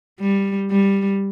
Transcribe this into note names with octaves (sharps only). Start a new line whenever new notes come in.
G3
G3